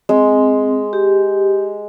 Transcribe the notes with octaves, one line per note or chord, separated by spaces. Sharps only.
G#3 C4
G4